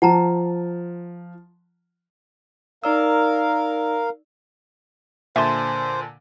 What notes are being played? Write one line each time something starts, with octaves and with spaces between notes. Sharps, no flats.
F3 F#5 A5 A#5
D#4 A#4 D5 F5 E6
A#2 D3 C5 E5 G#5 A5 C6